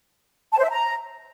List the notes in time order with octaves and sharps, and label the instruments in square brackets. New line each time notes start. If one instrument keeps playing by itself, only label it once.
[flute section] A5
C5
E5
A#5